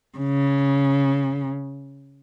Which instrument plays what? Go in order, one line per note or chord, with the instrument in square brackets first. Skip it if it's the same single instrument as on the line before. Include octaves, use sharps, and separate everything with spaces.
[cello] C#3